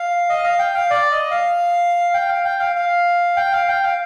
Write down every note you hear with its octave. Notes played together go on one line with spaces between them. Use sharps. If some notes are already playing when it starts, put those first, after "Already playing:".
Already playing: F5
D#5
F5
G5
F5
D5
D#5
F5
G5
F5
G5
F5
F5
G5
F5
G5
F5